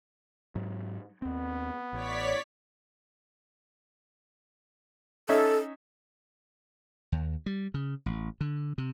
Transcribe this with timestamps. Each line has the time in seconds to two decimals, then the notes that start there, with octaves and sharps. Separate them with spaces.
0.55 G#2 F#3
1.22 D#2 B3 C4
1.93 A1 C#5 D5 B6
5.29 C#4 D#4 A4 E5
7.12 D#2
7.46 G3
7.74 C#3
8.06 A1
8.41 D3
8.78 C3